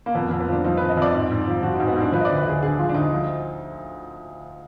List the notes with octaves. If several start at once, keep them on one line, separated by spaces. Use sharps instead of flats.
A#3
F2 B3
A#3
F2
B3
F3 D4
F3 D#4
B4
F2
D#5
F2
D5
G#2
G#2
F3
F3 F#4
D#4
G#2
B3
G#2 D4
F3 B4
D#5
D5
D2
B4
D2 G#4
D3 G#4
F3 F4
D4
D2 D#4
F3